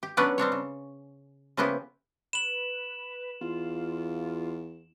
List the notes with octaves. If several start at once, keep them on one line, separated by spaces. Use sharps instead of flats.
G4
F#3 B3 C#4 D4 B4 D5
G3 C4 D4 C#5
C#3
C#3 F3 A#3 B3 E4 G4
B4 E7 F#7
E2 F4